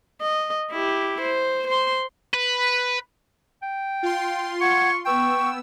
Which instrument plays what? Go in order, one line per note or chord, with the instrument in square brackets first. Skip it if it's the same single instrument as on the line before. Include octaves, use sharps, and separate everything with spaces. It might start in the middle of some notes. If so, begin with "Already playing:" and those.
[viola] D#5
E4 G4
C5
C5 C6
[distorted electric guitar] B4
[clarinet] G5
[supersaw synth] F4 C6
[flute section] F#5 G#6 [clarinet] C#6
[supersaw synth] B3 E6 [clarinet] G5 [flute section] C#6